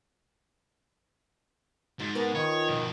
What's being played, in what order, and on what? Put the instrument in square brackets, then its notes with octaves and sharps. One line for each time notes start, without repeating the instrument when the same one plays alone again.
[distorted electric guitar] G#2 [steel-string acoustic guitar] F3 [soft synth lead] A6
[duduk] B3 [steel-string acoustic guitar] A#4 B4 G#5
[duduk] D#3 [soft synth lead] F4 [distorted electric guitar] C#5
[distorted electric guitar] B2 F3